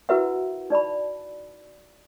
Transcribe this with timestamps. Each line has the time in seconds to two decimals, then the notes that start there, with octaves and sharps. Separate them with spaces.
0.09 E4 F#4 A#4 B4 E5 F#5
0.70 D#4 D5 A5 B5